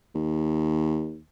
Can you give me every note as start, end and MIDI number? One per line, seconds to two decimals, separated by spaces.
0.15 1.20 39